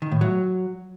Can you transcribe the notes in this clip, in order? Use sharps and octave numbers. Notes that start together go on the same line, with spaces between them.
D#3
A2
F#3